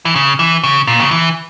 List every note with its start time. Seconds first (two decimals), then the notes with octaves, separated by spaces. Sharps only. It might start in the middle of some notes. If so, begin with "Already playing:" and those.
0.05 E3
0.15 C#3
0.39 E3
0.64 C#3
0.87 A#2
1.00 C#3
1.11 E3